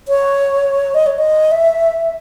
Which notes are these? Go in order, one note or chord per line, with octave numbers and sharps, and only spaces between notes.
C#5
D#5
C#5
D#5
E5